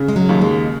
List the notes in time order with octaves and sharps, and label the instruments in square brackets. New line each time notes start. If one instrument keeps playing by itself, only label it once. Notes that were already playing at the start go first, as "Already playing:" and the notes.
Already playing: [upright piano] C#3
[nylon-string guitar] G#3
F#3
[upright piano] D#2
[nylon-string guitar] G#3